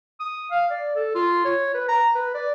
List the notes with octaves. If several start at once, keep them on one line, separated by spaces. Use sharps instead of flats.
D#6
F5
D5
A4
F4
C#5
B4
A#5
B4
D5